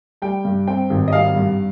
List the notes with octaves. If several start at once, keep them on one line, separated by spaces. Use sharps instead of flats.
G3 G5
G2
C4 G5
G#1
D#5
G3 F5
G2